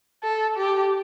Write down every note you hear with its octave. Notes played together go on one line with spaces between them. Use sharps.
A4
G4